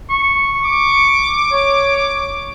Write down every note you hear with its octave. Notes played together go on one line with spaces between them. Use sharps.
C#6
D6
C#5